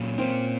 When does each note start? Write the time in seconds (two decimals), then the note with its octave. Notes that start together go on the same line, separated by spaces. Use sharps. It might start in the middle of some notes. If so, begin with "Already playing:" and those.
Already playing: A#2 F#3 C#4
0.18 A#3 C4